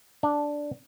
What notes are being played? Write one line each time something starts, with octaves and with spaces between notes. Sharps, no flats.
D4